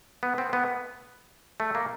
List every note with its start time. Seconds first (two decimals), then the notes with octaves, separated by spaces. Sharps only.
0.23 B3
0.38 C4
0.53 B3
1.60 A3
1.75 A#3